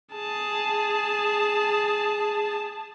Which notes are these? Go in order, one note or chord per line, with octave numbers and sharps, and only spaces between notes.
G#4 A5